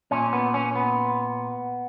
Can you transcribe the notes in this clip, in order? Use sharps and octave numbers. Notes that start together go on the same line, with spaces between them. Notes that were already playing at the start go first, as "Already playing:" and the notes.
A#2 C#4
B3
C#4
B3